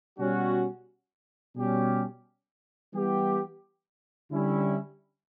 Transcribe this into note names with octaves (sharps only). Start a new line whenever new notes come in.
B2 G3 C#4 F#4
B2 G3 C#4 G4
E3 G3 B3 E4 G4
D3 G3 C#4 E4